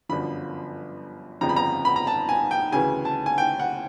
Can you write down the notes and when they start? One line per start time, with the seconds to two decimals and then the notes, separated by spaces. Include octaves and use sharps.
0.09 G1 F#2 D3 F3 B5
1.41 G1 F2 C#3 F3 A#5
1.49 B5
1.56 A#5
1.85 B5
1.96 A#5
2.07 A5
2.29 G#5
2.51 G5
2.72 D2 C#3 E3 G#5
3.05 A5
3.26 G#5
3.38 G5
3.59 F#5